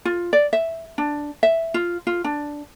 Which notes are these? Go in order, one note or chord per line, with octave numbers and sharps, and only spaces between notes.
F4
D5
E5
D4
E5
F4
F4
D4